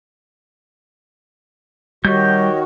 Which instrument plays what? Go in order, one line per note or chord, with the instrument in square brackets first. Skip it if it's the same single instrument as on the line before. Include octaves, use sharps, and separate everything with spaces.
[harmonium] D#3 F#4 [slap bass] G3 [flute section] G4 C#5 D#5 [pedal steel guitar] G6